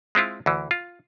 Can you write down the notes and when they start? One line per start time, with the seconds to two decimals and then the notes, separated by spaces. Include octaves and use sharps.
0.15 G#3 C4 E4 F4
0.46 D2 E3
0.71 F4